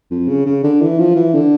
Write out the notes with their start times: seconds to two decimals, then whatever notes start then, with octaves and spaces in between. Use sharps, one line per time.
0.11 F2
0.29 C#3
0.46 C#3
0.64 D3
0.82 E3
0.99 F3
1.16 E3
1.34 D3